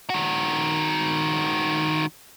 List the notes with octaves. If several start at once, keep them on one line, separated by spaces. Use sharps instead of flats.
D#3 F#4